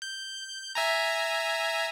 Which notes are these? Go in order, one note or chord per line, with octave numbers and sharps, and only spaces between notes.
G6
E5 G#5 A#5